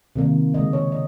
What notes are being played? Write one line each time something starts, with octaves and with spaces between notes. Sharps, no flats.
C3 D#3 A#3
C#3 G#3 D#5
C#5
D#5